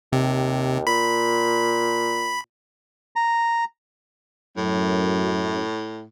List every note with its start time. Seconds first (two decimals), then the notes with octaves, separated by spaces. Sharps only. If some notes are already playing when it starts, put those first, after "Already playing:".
0.13 D#2 C3
0.87 A#2 B5
3.16 A#5
4.57 F#2 A2